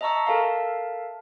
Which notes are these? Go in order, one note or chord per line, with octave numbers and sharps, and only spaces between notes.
D#5 E5 A5 A#5 C#6 E6
A4 A#4 E5 F5 A5